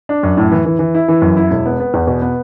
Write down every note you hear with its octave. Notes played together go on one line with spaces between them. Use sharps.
D4
F#2
A2
E3
E3
E3
E4
E3
F#2
E4
E1
B3
B3
E2
B2
B3